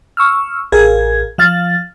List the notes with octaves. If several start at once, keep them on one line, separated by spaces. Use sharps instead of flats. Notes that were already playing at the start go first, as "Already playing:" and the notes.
C#6 E6 F6
A1 G#4 A#4 F5 G#6
F3 F5 F6 A6